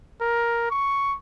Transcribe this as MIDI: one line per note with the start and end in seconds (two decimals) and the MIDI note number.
0.21 0.66 70
0.71 1.16 85